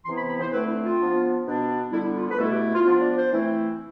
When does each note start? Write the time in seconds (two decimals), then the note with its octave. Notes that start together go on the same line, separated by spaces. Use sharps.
0.05 C3 E3 B3 E4 C6
0.18 B5
0.30 B5
0.40 C5
0.52 D3 A3 C4 E4 B4
0.67 E4
0.84 F4
1.00 F3 B3 D4
1.46 B2 B3 D4
1.92 D3 G3 B3 E4
2.16 F4
2.31 B4
2.38 B2 A3 E4 A4
2.51 G4
2.74 F4
2.85 F3 B3 D4 F4
3.01 D5
3.16 C5
3.31 E3 A3 C4 E4